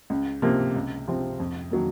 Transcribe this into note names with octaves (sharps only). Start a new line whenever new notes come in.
C#2
C3 F3 A#3
C#2
C3 F3 C4
F2
D#3 F#3 A#3